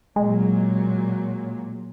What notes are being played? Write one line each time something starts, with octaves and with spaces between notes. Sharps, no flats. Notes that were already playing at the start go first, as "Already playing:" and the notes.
A#2 F#3 G#3